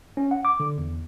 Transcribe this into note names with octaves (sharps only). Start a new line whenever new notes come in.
C#4
F#5
D6
D3
E2